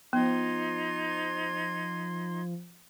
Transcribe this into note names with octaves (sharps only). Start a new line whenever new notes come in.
F3 B3 D#4 C6 G#6